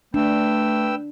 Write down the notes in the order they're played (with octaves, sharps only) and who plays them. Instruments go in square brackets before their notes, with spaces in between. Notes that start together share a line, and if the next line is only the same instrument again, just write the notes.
[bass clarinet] A3 [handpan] D4 [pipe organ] B4 G5 E6